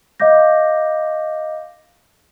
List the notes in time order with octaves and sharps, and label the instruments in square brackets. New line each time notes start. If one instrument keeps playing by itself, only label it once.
[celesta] D#5 F5 D6 G6 A#6